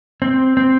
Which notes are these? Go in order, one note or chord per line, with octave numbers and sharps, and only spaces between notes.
C4
C4